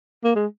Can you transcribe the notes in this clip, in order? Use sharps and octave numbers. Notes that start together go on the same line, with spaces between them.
A#3
G#3